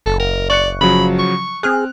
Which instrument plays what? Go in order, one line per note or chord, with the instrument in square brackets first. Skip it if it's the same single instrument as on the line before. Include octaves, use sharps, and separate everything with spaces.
[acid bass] F#1 [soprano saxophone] A4
[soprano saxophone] A#4
[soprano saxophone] D5 [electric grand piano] C#6 F#6 C#7
[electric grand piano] C#3 F3 F#3 [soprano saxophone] B5
[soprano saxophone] C#6
[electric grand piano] C4 F6 F#6 [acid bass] G#4